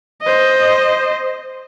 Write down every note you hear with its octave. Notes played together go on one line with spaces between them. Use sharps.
C5 D#5